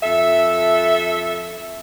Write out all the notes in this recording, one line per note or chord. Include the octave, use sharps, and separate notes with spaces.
F2 A4 E5